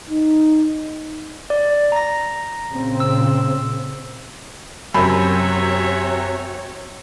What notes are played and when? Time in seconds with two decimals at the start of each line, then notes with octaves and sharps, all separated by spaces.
0.10 D#4
1.50 D5
1.92 A#5 A#6
2.68 A#2 C#3 C4
3.00 E6
4.95 F#2 C3 C4 F#4 A#4 C#5 E5 B5